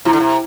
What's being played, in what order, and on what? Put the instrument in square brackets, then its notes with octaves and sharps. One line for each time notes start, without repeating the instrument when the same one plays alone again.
[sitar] C3 [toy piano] E4
[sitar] D3
C3